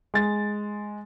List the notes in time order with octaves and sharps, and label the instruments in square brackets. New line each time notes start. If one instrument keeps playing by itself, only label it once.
[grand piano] G#3 A6